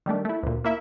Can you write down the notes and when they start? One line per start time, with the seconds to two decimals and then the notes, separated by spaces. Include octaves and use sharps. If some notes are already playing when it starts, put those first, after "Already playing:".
0.06 D#3 G3 A3 D4
0.25 A3 E4
0.43 D2 A#2
0.64 A#3 E4 E5